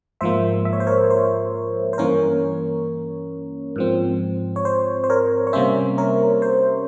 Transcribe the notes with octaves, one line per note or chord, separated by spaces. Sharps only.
G#2 F3 A#3 C5 E5
E5
C#5
C5
A#4 C#5
C5
C5
G2 E3 A#3 C#4 A#4 C#5
G#2 F3 C4
C#5
C5
C5
A#4 C#5
C#5
C3 G3 A#3 C#4 C5 E5
A#4 C#5
C5